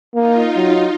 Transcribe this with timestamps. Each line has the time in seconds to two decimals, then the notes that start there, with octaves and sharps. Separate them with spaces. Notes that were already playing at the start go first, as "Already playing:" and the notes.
0.15 A#3 D#4 F4
0.56 F#3